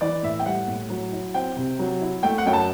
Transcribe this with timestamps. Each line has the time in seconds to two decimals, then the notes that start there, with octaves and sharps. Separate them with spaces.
0.01 E3 D5
0.23 A2 E5
0.39 G5
0.46 G3 F#5
0.68 A2
0.90 F#3
1.12 E4
1.34 C4 G5
1.57 C3
1.79 F#3
2.01 E4
2.23 A3 G5
2.38 F#5
2.46 F#2 G5
2.53 A5